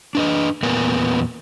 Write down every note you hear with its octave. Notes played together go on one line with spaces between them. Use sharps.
D4 B4 D#5
E2 A#2 B3 A#4 B4 G#5